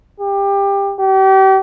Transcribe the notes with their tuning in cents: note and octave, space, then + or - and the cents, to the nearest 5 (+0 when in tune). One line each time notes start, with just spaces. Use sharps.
G4 +20
G4 -35